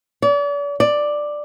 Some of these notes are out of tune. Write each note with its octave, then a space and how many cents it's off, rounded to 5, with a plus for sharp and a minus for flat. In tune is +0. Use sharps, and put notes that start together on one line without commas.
D5 -40
D5 +5